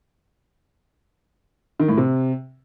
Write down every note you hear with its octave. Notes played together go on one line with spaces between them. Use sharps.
D#3
A2
C3